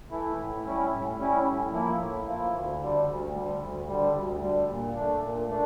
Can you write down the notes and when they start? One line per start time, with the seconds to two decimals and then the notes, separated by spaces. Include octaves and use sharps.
0.10 E3 A3 E4
0.37 A2
0.64 G3 C#4 E4
0.90 A2
1.18 G3 C#4 E4
1.45 A2
1.71 F3 A#3 E4
1.98 A2
2.26 F3 A#3 E4
2.53 D2
2.80 D3 G3
3.06 D2
3.33 D3 G3
3.60 D2
3.87 D3 G3
4.14 D2
4.41 D3 G3
4.68 A#2
4.95 D4
5.00 A3
5.22 A#2
5.49 A3 D4